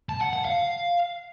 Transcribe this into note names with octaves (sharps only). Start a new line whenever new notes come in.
A5
F#5
F#5
F5